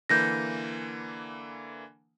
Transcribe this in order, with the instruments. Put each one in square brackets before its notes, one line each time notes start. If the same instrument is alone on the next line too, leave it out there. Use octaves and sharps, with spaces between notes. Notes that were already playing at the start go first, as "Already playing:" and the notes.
[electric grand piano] D3 E3 A#3 [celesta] G6 A#6